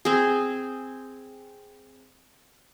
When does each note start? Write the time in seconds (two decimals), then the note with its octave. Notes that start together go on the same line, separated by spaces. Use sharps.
0.05 C4 G#4